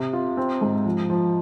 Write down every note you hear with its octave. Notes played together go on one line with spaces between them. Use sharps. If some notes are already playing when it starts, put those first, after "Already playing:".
Already playing: C3
F4
C4
G#2
F3
F3